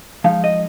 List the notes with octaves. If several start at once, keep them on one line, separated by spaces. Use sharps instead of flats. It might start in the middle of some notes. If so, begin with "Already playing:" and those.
F3 G#3 D#4 F5
D#5